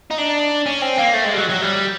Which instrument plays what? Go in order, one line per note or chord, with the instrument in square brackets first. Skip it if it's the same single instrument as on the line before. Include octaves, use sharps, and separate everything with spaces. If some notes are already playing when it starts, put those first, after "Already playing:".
[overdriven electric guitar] D#4
D4
C#4
C4
A#3
A3
G#3
G3
F#3
F#3
G3